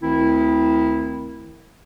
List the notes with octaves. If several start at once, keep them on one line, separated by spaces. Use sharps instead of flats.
D2 D#3 C4 E4